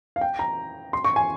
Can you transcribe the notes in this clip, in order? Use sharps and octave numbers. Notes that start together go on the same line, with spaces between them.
F5
G5
A#5
C6
C#6
G#5